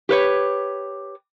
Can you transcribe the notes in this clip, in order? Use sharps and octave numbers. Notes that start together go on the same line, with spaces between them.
G4 B4 C#5